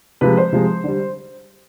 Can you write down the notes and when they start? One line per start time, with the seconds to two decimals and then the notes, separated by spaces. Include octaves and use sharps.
0.21 C3 F3 G#3 B4
0.37 C5
0.53 C3 F3 G#3
0.84 D3 G3